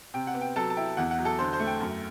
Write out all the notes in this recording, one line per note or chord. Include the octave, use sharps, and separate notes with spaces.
C3 G5
F#5
B3
G5
F#3 A4 A5
A5
E4 G5
E2 F#5
F#5
F#3
A4 A5
D3 C5 C6
C5 C6
A3
G5
F#2